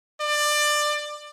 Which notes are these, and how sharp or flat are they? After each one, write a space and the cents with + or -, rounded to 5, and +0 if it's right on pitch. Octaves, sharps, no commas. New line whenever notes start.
D5 +20